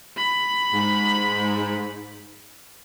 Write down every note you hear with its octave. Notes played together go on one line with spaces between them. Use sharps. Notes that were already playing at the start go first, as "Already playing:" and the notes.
B5
G#2